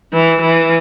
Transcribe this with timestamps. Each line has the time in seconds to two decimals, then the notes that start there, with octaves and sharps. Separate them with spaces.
0.13 E3
0.42 E3